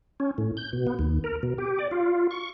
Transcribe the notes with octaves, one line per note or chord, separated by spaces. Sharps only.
C#4
A2
G6
B2
B3
D#2
A#4
B2
G4
D5
F4
C#6